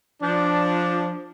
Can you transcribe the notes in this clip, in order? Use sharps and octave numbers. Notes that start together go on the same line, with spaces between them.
F3 D4